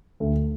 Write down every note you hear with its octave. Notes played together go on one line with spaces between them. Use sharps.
D2